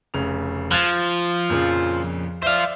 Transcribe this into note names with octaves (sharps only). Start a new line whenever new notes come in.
F1 C#3 F7
F3 F#6 G#6 A6
F2 A#2 C#3
C5 D5 E5 F5